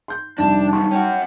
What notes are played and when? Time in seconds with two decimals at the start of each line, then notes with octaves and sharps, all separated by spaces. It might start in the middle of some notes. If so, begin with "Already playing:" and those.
0.08 C6 G6
0.38 F2 C3 G3 D4 D#4 A5
0.73 C#2 F#2 C#6
0.91 C#4 F#4 G5